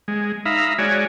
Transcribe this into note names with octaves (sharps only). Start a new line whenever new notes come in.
G#3
D#4 E5 F5 A#5 B5
G#3 F#4 C#5 D5 G#5